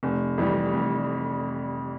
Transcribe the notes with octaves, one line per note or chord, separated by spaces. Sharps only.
F1
F2 E3 G3
F1